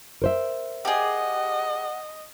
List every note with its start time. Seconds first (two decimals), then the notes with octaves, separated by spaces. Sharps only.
0.22 A#4 C5 E5
0.85 G4 G#4 D#5 F#5